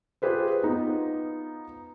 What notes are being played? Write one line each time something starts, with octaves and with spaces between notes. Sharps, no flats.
F4 G4 G#4 B4 C5
B3 D#4 F4